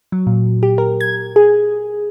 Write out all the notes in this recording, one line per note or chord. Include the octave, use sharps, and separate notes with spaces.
F#3
A#2
G4
A#4
G#6
G#4